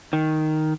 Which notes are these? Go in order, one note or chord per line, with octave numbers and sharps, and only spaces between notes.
D#3